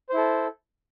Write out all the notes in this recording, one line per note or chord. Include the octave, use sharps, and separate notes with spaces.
E4 A4 C5